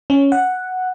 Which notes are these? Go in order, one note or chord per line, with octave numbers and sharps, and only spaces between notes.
C#4
F#5